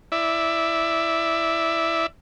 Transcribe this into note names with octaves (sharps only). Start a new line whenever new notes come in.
E4 D5 E5